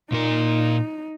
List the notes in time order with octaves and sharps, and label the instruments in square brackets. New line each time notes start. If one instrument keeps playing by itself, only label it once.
[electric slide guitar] A#2 A#4 [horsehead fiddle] D#4